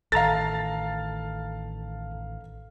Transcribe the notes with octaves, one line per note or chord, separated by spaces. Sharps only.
A1 D#3 A4 F5 A5 A#5 A6